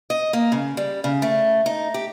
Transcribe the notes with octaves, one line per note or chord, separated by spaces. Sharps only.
D#5
A#3
C#3
G3
C#3
A3
D#4
G4